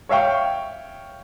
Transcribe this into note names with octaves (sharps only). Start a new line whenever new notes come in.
C#5 E5 F5 G5 C#6